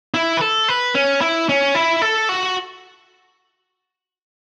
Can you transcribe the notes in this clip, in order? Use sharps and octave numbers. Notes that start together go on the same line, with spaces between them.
E4
B4
A4
B4
C#4
E4
C#4
E4
A4
F#4